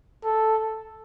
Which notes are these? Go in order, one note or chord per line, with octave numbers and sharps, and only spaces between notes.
A4